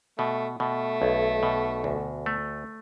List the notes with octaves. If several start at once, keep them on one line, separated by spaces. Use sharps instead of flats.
B2 A3
B2 A3
B1
B2
D2
A3